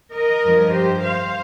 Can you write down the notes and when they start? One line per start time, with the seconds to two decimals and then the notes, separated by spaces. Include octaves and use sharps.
0.12 A#4 D#5
0.43 G2 F3
0.73 G4 C5
1.03 C5 F5